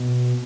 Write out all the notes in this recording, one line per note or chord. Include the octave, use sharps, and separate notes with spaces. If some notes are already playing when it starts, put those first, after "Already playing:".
Already playing: B2